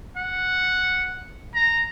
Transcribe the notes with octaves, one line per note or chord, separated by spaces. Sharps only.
F#5
A#5